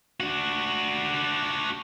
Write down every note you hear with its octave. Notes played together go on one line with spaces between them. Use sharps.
D4 F#4